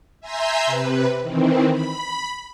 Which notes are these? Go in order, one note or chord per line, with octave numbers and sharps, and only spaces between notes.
E5 G#5 A#5 C6 E6 G6
C3 B4
D#3 E3 C4
B5